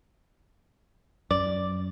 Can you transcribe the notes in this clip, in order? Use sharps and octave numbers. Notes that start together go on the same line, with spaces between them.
F#2 D5